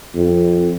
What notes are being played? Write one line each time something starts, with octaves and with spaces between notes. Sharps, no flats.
F2